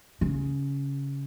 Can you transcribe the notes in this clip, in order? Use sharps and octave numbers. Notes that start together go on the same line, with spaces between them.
C#3